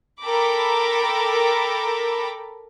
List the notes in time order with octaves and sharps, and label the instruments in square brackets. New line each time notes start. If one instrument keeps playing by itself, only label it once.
[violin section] A4 A#4 G5 A#5 B5 D6